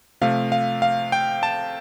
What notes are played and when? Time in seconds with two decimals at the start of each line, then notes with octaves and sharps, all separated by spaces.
0.21 C3 F3 A3 F5
0.52 F5
0.82 F5
1.12 G5
1.43 A5